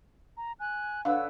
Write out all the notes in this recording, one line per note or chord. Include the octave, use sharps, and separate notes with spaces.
A#5
G#5 F#6
D3 B4 C#5 F5 E6